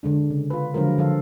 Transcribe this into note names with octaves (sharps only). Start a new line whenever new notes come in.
D3 G#3 D4
C#3
F4 B4
D3 F3 F#3 G#3 F4 A#4
D3 F3 F4 A4 F5